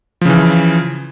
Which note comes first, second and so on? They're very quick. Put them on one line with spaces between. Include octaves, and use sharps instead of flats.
F3 C#3 E3